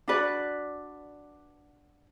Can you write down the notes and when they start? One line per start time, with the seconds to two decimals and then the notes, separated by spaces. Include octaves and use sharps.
0.08 D4 F#4 B4 D5